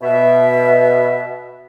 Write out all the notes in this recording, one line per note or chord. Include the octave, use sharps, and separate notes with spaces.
B2 E5